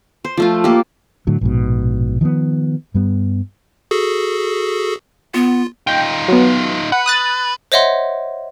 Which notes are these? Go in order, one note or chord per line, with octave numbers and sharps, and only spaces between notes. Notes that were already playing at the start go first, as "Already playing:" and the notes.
C5
F3 A3 F4
A#3 G4
A2 D3 F#3
A#1 G#2 B2
D#3 F3 G3 B3
G2 G3 B3
F#4 G#4 A4
B3 F4
D#4 F4 G5
F#3 B3
B4 F#5
D#6 F#6 A6
C5 C#5 D#5 E5 F#5 C6